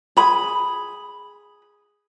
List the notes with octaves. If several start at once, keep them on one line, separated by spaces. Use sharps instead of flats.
G#4 B5